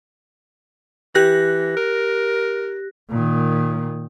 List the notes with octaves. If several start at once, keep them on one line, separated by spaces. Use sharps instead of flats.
E3 G4 F#6 A#6
A#4
A#2 D#3